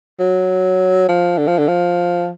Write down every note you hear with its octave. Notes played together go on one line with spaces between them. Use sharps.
F#3
F3
D3
F3
D3
F3